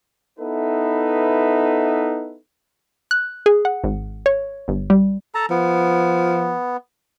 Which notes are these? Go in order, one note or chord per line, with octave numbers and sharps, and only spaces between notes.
B3 D#4 E4 A4 B4 E5
F#6
G#4
F#5
G#1
C#5
G1
G3
A4 A5 A#5
F3 B3